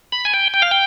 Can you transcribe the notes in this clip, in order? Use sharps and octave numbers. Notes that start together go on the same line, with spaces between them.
B5
G#5
G5
G5
F5
G5